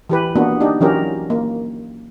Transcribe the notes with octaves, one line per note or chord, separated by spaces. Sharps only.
E3 G4 B4
A#3 B3 D4 F#4
D4 D#4 G4
E3 F#3 C#4 G4 A#4
A#3